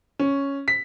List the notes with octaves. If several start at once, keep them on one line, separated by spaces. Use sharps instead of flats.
C#4
B6